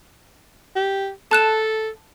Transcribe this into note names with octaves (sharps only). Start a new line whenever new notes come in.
G4
A4 A5 F#6 E7